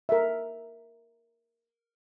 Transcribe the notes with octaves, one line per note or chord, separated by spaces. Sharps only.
A#4 E5